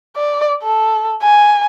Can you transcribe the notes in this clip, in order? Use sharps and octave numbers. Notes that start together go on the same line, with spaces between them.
D5
A4
G#5